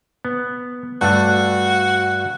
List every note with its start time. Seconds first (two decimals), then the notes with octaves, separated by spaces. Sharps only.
0.25 B3
1.01 G2 A3 D4 F#4 F#6